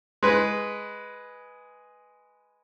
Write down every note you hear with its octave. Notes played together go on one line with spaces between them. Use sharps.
G#3 B4